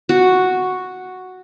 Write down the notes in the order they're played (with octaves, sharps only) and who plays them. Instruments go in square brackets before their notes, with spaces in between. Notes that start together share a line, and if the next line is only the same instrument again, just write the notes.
[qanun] F#4